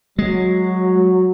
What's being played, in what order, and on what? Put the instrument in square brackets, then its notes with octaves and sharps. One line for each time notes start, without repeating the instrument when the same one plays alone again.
[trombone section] F#3 [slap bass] G#3